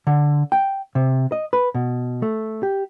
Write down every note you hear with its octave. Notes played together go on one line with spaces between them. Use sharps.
D3
G5
C3
D#5
B4
B2
A3
G4